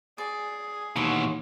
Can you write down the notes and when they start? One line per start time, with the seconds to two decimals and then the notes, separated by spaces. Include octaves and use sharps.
0.18 G#4 D5
0.96 D#2 B2 E3 C#5 F#5 C6